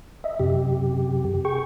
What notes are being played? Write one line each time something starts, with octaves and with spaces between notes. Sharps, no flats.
D#5 E5
F#2 C3 G4
G#4 G5 C#6